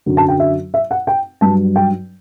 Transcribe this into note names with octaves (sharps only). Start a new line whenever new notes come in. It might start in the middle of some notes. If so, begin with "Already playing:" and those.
F#2 D3 F#3
A5
G5
E5
E5
F#5
G5
G2 F#3 A5
G5